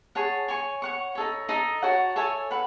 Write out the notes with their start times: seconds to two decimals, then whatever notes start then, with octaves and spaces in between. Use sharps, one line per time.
0.15 G#4 C#5 F#5 A5
0.48 C#5 G#5 C#6
0.82 C#5 F#5 C#6
1.15 D#4 A4 C#5
1.49 D#4 A4 D#5
1.82 F#4 C#5 F#5 A5
2.16 A4 C#5 E5 G#5
2.51 B4 F#5